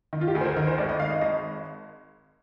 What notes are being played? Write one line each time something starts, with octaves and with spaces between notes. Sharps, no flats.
D#3
F4
G4
D2 G#4
C5
A#4
D#3 A#4
C5
G#1 D5
D#5
D#3 F5
D#5
G#1 D#5